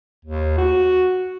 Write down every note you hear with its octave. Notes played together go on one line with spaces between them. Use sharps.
D#2
F#4